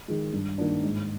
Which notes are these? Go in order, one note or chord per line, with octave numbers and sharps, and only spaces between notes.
D#3 G#3
G2
D#3 A#3 D4
G#2